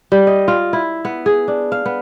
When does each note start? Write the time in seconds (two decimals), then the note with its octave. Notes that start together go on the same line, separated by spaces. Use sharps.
0.12 G3
0.27 D#5
0.48 F4
0.73 E4
1.05 B3
1.26 G#4
1.48 D4
1.72 F5
1.86 B3